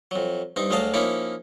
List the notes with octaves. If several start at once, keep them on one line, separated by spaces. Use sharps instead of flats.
F2 F#3
G2 C4 D#4
D2 F#3 G#3 D#5 F5 A5
F3 A#3 C#4 D#4 E4 C#5